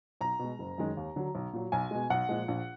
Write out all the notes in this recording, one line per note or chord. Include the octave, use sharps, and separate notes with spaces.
B1 A#5
B2 G#3
F#1
F#2 D#3 G#3
D#2
D3 F#3
B1
A#2 F#3
B1 G#5
B2 G#3
B1 F#5
A#2 F3 G#3
A#1